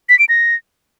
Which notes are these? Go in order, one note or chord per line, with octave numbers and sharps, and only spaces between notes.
B6
D7
A#6